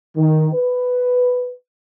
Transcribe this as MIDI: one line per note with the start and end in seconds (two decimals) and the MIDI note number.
0.16 0.48 51
0.53 1.52 71